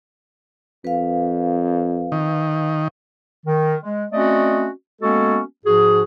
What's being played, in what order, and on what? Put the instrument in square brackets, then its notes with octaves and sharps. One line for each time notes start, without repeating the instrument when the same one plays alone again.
[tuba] F2 [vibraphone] B4 F5
[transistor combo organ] D#3
[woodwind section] D#3
G#3
A3 C4 C#4 F#4 D5 D#5
G#3 A#3 B3 C#4 F#4 A4
G#2 F3 F#4 G#4